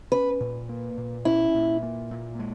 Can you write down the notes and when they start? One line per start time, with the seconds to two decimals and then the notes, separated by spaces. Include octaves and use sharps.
0.12 C#4 B4
0.40 A#2
0.69 A#3
0.97 A#2
1.25 C#4 E4
1.54 A#2
1.83 A#3
2.11 A#2
2.39 G#3